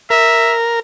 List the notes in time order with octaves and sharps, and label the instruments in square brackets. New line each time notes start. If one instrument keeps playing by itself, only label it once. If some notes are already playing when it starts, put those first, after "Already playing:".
[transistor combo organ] A#4 [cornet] E5